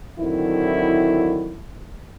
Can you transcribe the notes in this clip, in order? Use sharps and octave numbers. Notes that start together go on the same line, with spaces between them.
D3 D#3 F#3 C4 E4